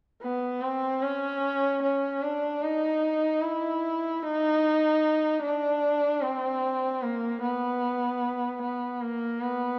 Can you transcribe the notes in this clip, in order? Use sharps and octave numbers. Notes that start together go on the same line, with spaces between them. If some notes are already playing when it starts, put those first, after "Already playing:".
B3
C4
C#4
C#4
D4
D#4
E4
D#4
D4
C4
A#3
B3
B3
A#3
B3